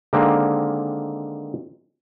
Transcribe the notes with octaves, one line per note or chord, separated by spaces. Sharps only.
D3 D#3 G#3 A#3 C4